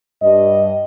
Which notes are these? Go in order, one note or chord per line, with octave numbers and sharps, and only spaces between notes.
G2 D#5